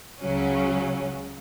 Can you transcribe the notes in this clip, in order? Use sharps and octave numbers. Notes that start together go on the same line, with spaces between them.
C#2 C#3 F#3 C#4